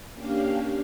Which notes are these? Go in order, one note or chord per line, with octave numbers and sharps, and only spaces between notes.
A#3 C#4 D4 G4 F5